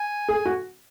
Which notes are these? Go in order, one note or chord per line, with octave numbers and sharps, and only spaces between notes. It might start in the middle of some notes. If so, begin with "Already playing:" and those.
Already playing: G#5
G#4
F#4